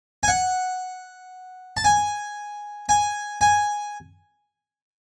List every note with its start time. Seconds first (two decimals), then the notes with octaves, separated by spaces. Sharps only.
0.23 G#5
0.28 F#5
1.77 A5
1.84 G#5
2.89 G#5
3.41 G#5